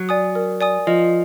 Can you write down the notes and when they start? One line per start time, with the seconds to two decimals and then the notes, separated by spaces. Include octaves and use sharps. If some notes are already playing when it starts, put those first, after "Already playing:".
Already playing: F#3
0.09 D5 G#5 D#6
0.35 A#4
0.61 D5 G#5 D#6
0.87 F3 D#5